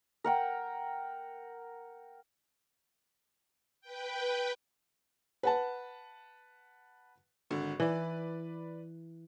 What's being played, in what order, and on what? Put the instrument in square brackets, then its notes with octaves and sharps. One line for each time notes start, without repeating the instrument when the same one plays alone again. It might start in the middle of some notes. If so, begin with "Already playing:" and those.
[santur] A#4 F#5 G5
[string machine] B4 G5
[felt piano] B4 F#5 A5
[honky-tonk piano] G#1 D3 F#4
[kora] E3 [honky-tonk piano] B4 D5